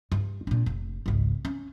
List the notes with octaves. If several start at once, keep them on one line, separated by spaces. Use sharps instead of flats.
G2
A#2 D4
F1
G#1 C#2
C#4